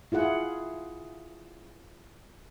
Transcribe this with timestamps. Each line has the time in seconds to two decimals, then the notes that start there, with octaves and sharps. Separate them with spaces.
0.12 E4 F4 G#4 F#5